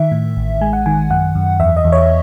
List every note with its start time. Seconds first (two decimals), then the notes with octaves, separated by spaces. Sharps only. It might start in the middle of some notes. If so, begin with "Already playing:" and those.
Already playing: D#3 E5
0.12 A2
0.37 A1
0.61 G#3 G#5
0.73 F#5
0.86 D#3 G#5
1.10 F#2 F#5
1.35 F#2
1.60 E2 E5
1.77 D#5
1.84 E2
1.92 C#5